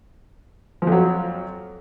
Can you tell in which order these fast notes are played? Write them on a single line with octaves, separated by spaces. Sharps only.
F3 F2 F#3